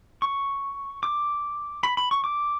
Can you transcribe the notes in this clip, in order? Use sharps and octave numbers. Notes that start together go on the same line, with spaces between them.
C#6
D6
B5
B5
C#6
D6